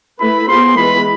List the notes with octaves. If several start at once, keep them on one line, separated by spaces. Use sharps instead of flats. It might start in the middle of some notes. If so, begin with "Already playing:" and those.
A3 E4 B4 B5
B3 F4 G#4 C5 C6
E3 G#3 B3 F4 B4 B5